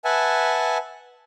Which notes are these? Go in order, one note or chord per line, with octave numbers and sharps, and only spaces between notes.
B4 E5 F#5 G#5 A5